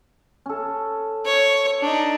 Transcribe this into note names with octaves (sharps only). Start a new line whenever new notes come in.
C#4 A4
C#5
D4 D#4